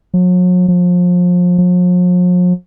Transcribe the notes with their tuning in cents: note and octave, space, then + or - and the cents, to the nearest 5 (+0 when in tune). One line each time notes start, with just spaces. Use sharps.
F#3 -40
F3 +30
F3 +45